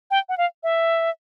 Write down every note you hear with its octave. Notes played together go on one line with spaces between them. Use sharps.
G5
F#5
F5
E5